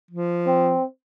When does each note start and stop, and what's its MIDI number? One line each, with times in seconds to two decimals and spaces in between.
0.11 0.77 53
0.46 0.84 60